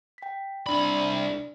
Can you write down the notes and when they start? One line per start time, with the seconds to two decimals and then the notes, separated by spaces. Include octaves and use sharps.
0.18 G5 B6
0.67 C2 D4 D5 B5